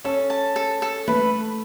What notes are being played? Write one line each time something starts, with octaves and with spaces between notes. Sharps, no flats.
C#4 A4
A5
A4
A4
A3 B4